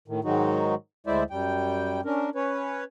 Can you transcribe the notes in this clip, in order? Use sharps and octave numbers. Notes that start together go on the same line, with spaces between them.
A2 D#3
G#2 D#3 F#3 G#3 D#4 F#4
D2 G#3 E4 C5 D5 E5
F#2 G3 G5
C#4 D4 A#4
C#4 B4 C#5